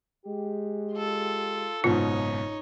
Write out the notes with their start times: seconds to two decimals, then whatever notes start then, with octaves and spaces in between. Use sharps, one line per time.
0.25 G#3 G4
0.93 F4 A4
1.84 F#1 G#2 B2 D#4 F4 C#5